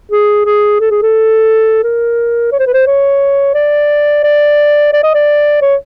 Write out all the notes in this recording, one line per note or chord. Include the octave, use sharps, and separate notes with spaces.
G#4
G#4
A4
G#4
A4
A#4
C#5
C5
B4
C5
C#5
D5
D5
D5
D#5
D5
C#5